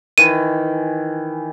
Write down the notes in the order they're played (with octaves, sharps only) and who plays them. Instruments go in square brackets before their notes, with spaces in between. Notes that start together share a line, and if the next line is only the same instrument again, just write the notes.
[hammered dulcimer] D#3 E3 [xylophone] D#7